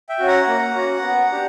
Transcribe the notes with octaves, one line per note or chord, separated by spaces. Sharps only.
E5 G5
C#4 F#4
F#5 A#5
A#3
C#4 F#4
B3
D4 G4